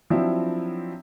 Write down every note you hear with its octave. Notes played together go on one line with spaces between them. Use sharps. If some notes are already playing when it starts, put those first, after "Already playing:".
F3 F#3 C4 D4 E4